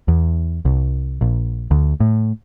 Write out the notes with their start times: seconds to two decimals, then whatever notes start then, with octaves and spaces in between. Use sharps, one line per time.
0.08 E2
0.65 C2
1.21 A#1
1.71 D2
2.00 A2